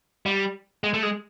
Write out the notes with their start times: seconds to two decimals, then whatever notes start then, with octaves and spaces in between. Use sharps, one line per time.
0.26 G3
0.84 G#3
0.94 A3
1.03 G#3